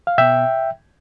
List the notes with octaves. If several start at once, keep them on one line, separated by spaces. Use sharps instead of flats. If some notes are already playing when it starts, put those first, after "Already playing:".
F5
B2 B3 E5 G5